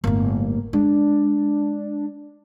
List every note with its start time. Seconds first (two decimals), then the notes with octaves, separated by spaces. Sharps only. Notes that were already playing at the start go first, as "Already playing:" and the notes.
0.04 G1 A2 A#3
0.73 G#3 D4